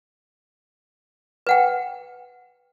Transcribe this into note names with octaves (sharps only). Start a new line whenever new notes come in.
B4 F#5 G5